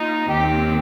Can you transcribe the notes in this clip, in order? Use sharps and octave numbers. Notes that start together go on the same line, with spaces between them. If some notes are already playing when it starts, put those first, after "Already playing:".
Already playing: A#3 D#4 F4
D#2 D#3 C4 G4